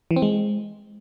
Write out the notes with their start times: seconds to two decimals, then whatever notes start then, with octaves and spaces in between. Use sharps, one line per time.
0.11 E3
0.16 C4
0.22 G#3